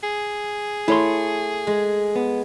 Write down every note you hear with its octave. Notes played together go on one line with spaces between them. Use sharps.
G#4
A3 E4 C#5 C6
G#3
B3